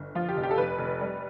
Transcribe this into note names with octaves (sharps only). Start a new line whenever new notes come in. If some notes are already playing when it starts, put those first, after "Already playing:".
Already playing: G1
F3 F4
G4
F1
G4
A4
F1 B4
F1
G3